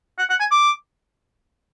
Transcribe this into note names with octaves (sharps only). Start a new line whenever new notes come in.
F#5
F#5
G#5
D6